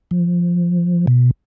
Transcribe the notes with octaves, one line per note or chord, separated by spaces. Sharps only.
F3
B2